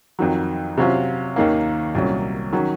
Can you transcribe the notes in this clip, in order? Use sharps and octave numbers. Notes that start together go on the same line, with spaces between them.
F2 D#3 F#3
C3 F#3 C#4 F4
D#2 D#3 A#3 C#4
C2 A#2 F#3 C#4
D#3 F#3 C#4